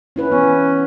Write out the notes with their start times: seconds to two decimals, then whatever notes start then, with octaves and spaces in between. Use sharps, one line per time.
0.16 C#4 E4 B4
0.30 E3 B3 C#4